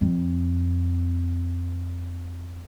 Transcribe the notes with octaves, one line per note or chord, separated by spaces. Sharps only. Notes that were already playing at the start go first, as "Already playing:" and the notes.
F2 C4